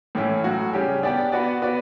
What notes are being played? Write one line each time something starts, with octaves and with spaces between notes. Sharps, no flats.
A2 E3 A3 C#4 E4
A2 F#3 C#4 F#4
C#3 G3 C#4 G4
B3 D4 G4 D5
B3 F#4 B4 D5
B3 F#4 B4 D5